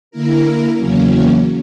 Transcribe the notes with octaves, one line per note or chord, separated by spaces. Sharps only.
D3 A#3 E4 A#4
E2 C#3 F#3 A#3 C#4